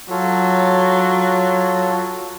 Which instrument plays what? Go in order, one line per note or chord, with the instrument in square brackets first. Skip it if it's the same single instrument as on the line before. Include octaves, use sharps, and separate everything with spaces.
[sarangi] F#3 [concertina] F4 A4 C#5